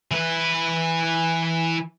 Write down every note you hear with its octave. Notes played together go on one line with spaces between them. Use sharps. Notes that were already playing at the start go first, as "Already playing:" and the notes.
E3 B4